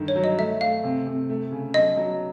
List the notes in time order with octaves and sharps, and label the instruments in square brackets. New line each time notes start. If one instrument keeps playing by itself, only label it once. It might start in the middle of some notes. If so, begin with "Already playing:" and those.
Already playing: [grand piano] G2 D3 D#3
[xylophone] C#5
[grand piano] F#3
[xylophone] D#5
[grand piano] A3 [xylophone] E5
[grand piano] A3 [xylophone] F5
[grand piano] C3
C3
A3
C#3
[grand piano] B1 [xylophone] D#5
[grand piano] F#3